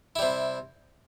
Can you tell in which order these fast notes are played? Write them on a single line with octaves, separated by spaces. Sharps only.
E4 G3 C3